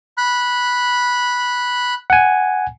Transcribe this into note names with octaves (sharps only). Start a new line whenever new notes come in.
B5 F#6
F#5 G#5